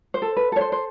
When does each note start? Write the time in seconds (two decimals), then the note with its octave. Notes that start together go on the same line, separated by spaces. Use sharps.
0.14 C5
0.22 A4
0.37 B4
0.52 A4 C#5
0.61 C5
0.72 C5